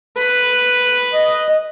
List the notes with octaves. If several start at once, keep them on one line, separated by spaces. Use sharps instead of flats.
B4
D#5